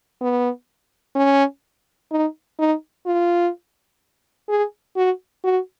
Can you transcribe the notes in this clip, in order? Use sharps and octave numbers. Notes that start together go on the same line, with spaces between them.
B3
C#4
D#4
D#4
F4
G#4
F#4
F#4